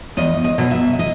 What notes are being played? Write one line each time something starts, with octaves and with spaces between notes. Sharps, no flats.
E2 D#5
D#5
B2 F#3
E5
D#5